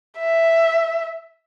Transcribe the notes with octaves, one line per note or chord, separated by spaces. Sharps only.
E5